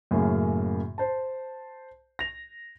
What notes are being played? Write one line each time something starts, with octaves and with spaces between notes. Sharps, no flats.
F#2 A2 C#3 A#3
C5 A5
A#6 F7